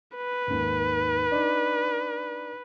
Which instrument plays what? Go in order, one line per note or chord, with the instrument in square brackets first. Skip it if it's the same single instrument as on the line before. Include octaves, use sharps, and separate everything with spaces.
[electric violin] B4
[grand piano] G#1 D#2
D4 D#4